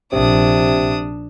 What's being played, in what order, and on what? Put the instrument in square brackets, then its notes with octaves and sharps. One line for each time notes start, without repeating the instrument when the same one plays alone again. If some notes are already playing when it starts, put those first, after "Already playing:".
[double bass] A#1 [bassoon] C3 [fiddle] D4 D#6